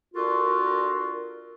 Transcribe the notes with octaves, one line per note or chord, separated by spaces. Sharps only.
D4 F4 F#4 A4 A#4